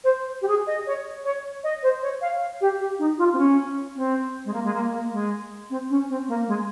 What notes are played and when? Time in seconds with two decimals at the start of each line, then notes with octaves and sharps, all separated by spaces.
0.04 C5
0.42 G4
0.48 G#4
0.67 D#5
0.87 C#5
1.25 C#5
1.64 D#5
1.83 C5
2.02 C#5
2.22 F5
2.61 G4
2.80 G4
2.99 D#4
3.18 F4
3.33 C4
3.38 C#4
3.96 C4
4.45 G#3
4.53 A#3
4.65 G#3
4.74 A#3
4.93 A#3
5.12 G#3
5.70 C4
5.90 C#4
6.09 C4
6.28 A#3
6.48 G#3